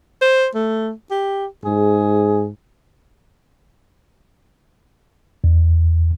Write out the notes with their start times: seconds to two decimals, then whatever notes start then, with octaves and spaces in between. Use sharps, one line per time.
0.21 C5
0.55 A3
1.11 G4
1.65 G#2 G#4
5.44 E2